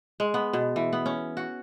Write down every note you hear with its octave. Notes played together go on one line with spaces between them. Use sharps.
G#3
B3
B2
E3
B3
C#4
F#4